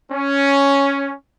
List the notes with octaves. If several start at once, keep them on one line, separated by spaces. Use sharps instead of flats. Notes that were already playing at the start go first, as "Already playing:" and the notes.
C#4